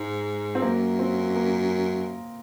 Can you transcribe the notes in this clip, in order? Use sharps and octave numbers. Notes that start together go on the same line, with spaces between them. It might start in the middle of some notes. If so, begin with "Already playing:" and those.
Already playing: G#2 G#3
C4
F#2 A#3
C4
A#3